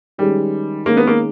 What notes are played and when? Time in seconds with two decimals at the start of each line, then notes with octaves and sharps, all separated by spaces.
0.18 D#3 G3 G#3 C#4 G#4
0.86 D#3 G#3 A#3 C#4 G#4
0.97 B3
1.07 A#3